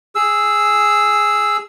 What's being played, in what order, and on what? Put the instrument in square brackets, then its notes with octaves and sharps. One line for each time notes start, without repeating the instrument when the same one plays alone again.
[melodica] G#4 E6